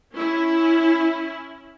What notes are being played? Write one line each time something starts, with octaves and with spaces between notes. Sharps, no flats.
C#4 E4